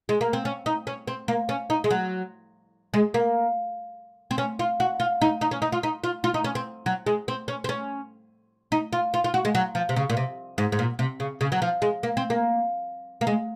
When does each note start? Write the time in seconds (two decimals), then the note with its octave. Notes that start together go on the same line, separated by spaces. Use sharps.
0.09 G#3
0.21 A#3
0.33 C4
0.45 C#4
0.66 D#4
0.87 C#4
1.08 C4
1.28 A#3
1.49 C#4
1.70 D#4
1.84 G#3
1.90 F#3
2.94 G#3
3.14 A#3
4.31 C4
4.38 C#4
4.59 F4
4.80 F#4
5.00 F4
5.21 D#4
5.41 D#4
5.51 C#4
5.62 D#4
5.72 F4
5.83 D#4
6.04 F4
6.24 F4
6.34 D#4
6.44 C#4
6.55 C4
6.86 F#3
7.07 G#3
7.28 C4
7.48 C#4
7.64 C4
7.69 C#4
8.72 D#4
8.93 F4
9.14 F4
9.24 F4
9.34 F#4
9.45 G#3
9.55 F#3
9.75 F3
9.89 C3
9.96 C#3
10.10 A#2
10.17 C3
10.58 G#2
10.72 G#2
10.79 A#2
10.99 C3
11.20 C#3
11.41 C#3
11.52 F#3
11.62 F3
11.82 G#3
12.03 A#3
12.17 C4
12.30 A#3
13.21 A#3
13.27 G#3